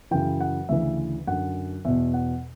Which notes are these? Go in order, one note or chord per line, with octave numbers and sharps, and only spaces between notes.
F#2 C#3 E3 G5
F#5
D2 C#3 E3 E5
F#2 D3 F#5
E2 B2 E5
F#5